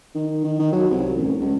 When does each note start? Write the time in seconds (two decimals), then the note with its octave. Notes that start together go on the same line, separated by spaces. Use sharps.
0.15 D#3
0.44 D#3
0.59 D#3
0.73 F#3
0.91 C2
1.18 A1
1.40 C#2